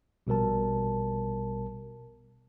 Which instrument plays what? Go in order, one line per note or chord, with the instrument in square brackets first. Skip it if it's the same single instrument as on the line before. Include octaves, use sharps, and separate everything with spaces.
[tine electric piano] A#1 B2 G3 A#4 A5